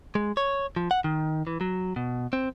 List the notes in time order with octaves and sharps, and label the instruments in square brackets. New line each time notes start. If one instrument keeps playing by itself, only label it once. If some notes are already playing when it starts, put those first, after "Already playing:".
[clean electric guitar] G#3
C#5
F3
F#5
D#3
E3
F#3
B2
C4